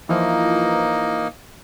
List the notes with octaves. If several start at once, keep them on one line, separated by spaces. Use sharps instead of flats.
E3 F3 A#3 D#4